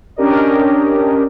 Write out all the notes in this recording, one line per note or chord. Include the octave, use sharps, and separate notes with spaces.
C#4 D4 G4 A#4 D5 D#5